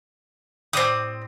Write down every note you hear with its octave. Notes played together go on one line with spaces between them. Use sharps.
A2 C4 G4 D5 D#6